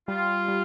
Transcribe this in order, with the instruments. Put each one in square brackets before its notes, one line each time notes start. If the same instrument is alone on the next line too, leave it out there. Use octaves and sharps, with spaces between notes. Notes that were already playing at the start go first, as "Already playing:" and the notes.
[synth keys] G3 [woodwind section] F4
[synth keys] G3